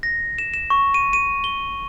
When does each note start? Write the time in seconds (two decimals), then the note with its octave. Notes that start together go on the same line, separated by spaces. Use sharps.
0.03 A#6
0.38 E7
0.54 E7
0.70 C#6
0.94 D#7
1.13 D#7
1.44 G7